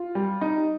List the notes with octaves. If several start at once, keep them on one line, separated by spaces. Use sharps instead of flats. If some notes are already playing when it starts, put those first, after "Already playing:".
Already playing: F4
G3
D#4